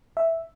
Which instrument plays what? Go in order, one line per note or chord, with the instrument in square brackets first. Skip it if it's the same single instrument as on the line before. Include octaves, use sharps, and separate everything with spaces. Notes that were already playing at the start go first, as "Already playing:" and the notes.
[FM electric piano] E5